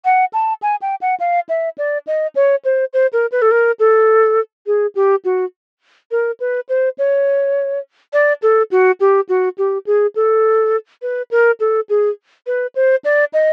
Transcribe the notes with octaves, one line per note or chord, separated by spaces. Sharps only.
F#5
A5
G#5
G5
F#5
F5
E5
D5
D#5
C#5
C5
C5
A#4
B4
A4
A#4
A4
G#4
G4
F#4
A#4
B4
C5
C#5
D5
A4
F#4
G4
F#4
G4
G#4
A4
B4
A#4
A4
G#4
B4
C5
D5
D#5